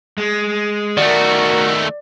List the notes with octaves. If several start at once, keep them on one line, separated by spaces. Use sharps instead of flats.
G#3
D#3 A3 F#4 A#4 D5